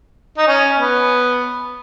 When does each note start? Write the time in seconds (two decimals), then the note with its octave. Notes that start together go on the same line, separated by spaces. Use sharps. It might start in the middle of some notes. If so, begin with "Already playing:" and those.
0.38 D#4
0.48 C#4
0.78 B3